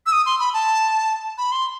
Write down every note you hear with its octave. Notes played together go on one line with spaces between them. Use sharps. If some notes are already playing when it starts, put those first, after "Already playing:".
E6
D#6
C6
B5
A5
B5
C6